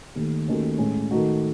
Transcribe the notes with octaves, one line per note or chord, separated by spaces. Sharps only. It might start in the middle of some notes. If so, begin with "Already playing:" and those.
D#2 D#3 A3
D#2 D#3 A3 C#4 F#4
A2 G#3 C#4
D#3 A3 D#4 F#4